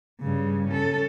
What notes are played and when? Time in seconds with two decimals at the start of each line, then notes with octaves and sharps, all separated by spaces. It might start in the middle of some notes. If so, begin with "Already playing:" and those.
0.21 G2 C#3
0.68 C#4 A4